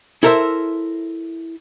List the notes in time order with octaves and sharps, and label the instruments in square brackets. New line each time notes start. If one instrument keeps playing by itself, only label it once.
[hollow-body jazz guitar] E4 A4 A#4 C5 E5